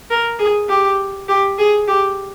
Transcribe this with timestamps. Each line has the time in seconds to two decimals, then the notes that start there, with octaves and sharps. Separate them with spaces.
0.10 A#4
0.39 G#4
0.69 G4
1.28 G4
1.58 G#4
1.88 G4